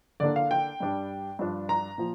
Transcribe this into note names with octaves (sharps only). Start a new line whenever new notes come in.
D3 A#3 D4 D5
F5
G5
G2 G3 D4
G2 F3 D4
A#5
A#2 F3